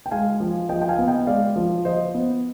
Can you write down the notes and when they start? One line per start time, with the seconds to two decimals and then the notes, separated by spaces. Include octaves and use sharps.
0.06 G5
0.11 G#3 F5 G#5
0.40 F3
0.69 F3 D#5 G5
0.82 G5
0.89 F5 G#5
0.98 B3
1.08 D#5 G5
1.27 G#3 D5 F5
1.56 F3
1.85 F3 C5 D#5
2.14 B3